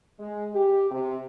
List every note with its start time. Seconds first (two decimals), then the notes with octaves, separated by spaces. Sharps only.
0.20 G#3
0.54 G4
0.91 C3